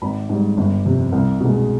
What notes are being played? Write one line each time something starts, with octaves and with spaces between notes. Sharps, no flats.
G#1 B5
G#2 G3
G1
F2 C3
C2
B2
G#3